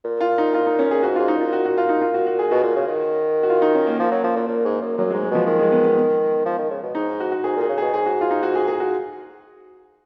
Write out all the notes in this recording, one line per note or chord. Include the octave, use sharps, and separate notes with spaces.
A#2
F4
D#4
F4
D#4
C#4
G#4
G#2 F#4
G#2 F4
D#4
A#2 F4
F#4
F#4
F4
D#4
F4
F#4
F#4
G#4
B2 F#4
A#2
C#3
D#3
F#4
F4
D#4
C#4
A#3
F3
F#3
F3
A#2
A#2
G#2
F#2
F#2 F#3
G#3
G#2
G#3
B2 F3
D#3
G#3
B3
B3
F3
D#3
C#3
B2
G#2 D#4
F#4
F#4
G#2 G#4
A#2 G#4
C#3
B2 G#4
G#2 G#4
F#4
F4
D#4
F#4
G#4
G#4
F#4